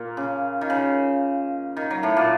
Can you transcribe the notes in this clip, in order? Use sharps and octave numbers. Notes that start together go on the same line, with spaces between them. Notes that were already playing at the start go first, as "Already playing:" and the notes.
Already playing: A#2 A#3
C#3
D#3
C#3
D#3
F#3
A2 A3
A#2 A#3